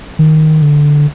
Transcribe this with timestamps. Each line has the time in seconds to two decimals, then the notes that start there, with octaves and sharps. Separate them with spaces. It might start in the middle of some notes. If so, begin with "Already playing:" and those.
0.19 D#3
0.62 D3